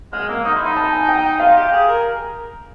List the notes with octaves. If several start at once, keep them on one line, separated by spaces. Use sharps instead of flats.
G#3 F6
A#3 E6
D#4 D#6
E4 C6
D#4 B5
A5
G#5
G5
F4 F5
G4
G#4
A#4